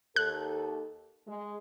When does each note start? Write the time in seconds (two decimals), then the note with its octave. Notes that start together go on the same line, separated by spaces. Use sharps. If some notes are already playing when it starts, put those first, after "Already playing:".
0.16 D#2 A4 F#6
1.28 G#3